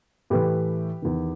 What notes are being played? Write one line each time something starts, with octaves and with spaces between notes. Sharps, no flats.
A2 E3 G4 B4
E2 D#3